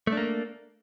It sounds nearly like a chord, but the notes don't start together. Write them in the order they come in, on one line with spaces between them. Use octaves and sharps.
A3 D4 A#3